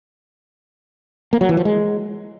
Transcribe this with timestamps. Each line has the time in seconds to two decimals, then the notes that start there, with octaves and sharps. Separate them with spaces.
1.33 A#3
1.41 F#3
1.49 E3
1.57 F3
1.65 G#3